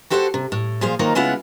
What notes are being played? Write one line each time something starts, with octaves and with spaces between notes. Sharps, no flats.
F#4 G4 A4 C5 E5 F#5
C3
A2
A#2 F3 G#4 C5 F5
D#3 F#3 A#3 D#4 F4 C5
C#3 G#3 B3 E4 F4 F#5